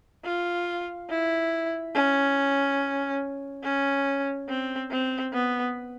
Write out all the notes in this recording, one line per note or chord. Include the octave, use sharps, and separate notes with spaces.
F4
E4
C#4
C#4
C4
C4
B3